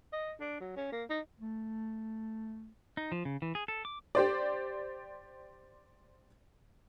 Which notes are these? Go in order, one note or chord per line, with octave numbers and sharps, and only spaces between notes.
D#5
D4
F#3
C#4
A#3
D#4
A3
D#4
F3
C#3
E3
G#4
A4
D6
G4 C5 D5